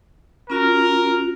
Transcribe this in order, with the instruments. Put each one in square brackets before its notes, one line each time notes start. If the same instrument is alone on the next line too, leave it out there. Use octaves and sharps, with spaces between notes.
[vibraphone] C#4 F4 F#4 [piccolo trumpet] A#4